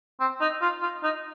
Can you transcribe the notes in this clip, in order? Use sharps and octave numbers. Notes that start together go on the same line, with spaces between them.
C4
D#4
F4
F4
D#4